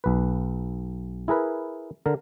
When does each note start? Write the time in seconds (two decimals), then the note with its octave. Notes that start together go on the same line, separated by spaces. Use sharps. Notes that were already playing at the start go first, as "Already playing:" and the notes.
0.04 B1 B4
1.28 E4 G#4 A#4 B4
2.06 D3 A#4